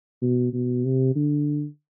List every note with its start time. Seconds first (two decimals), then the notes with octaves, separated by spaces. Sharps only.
0.22 B2
0.53 B2
0.85 C3
1.16 D3